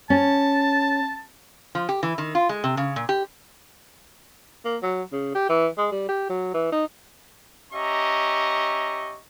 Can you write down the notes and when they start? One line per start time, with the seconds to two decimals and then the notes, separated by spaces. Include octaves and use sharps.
0.10 C#4 A5
1.75 F3
1.89 G4
2.03 E3
2.18 D#3
2.35 F4
2.49 G#3
2.64 C3
2.77 C#3
2.96 A#2
3.09 G4
4.65 A#3
4.82 F#3
5.12 C#3
5.35 G4
5.49 E3
5.78 G#3
5.92 G3
6.09 G4
6.29 F#3
6.54 E3
6.72 D#4
7.73 C#4 G4 D#5 E5 A#5 C#6